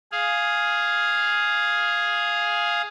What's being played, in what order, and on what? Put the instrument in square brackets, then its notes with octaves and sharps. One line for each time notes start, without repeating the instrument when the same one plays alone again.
[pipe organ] G#4 F5